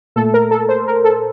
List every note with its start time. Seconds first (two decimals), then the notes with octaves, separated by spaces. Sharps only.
0.16 A#2 A3 A4
0.34 A#4
0.51 A4
0.69 C5
0.87 A#4
1.04 A4